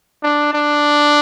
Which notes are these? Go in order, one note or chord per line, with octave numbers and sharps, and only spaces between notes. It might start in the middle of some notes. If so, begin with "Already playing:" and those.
D4
D4